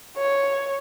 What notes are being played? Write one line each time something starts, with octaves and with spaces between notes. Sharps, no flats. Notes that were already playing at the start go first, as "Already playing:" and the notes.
C#5